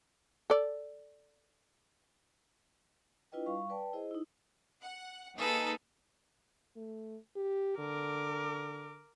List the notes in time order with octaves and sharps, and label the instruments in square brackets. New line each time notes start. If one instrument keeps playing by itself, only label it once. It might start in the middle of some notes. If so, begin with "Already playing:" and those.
[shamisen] A4 D5
[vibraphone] D4 E4 F4 B4 D#5 G5
G3 F5 C#6
B4 D5 G5 A5
E4 G#4 C5 D#5
D#4 E4
[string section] F#5
[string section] A#3 D#4 G#4 [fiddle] A4 B4
[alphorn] A3
G4
[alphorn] D3 [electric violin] A#4 D6